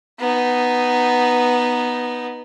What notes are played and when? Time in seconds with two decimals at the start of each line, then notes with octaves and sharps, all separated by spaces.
0.20 B3 D#4